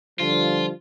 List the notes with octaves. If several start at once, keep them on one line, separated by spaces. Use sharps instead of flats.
D3 F3 G3 F4